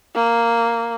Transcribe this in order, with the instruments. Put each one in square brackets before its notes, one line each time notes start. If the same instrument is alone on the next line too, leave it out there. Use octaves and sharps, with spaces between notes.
[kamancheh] A#3